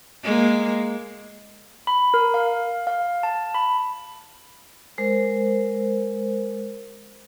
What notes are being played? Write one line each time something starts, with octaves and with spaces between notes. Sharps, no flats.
G#3 A#3
B5
A#4
F5
F5
A5
B5
G#3 A#4 C5